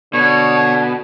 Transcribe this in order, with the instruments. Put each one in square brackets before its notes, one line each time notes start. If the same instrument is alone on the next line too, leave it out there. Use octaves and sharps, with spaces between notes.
[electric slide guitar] B2 [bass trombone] D3 [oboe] C#5